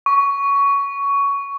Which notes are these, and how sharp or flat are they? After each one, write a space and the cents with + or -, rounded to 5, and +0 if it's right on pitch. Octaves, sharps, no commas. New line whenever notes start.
C#6 +15